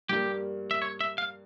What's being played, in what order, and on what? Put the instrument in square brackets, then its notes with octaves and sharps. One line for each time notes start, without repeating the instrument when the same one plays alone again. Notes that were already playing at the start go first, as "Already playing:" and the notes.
[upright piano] G2 G3 A#3 [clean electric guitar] G4
[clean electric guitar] E5
C#5
E5
F5